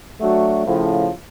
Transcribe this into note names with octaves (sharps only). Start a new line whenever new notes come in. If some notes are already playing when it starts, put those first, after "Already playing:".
F#3 A3 D4 F#4
A2 C#3 F3